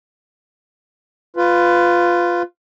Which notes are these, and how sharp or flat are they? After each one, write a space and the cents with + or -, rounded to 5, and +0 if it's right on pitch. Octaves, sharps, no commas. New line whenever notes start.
F4 +0 B4 +15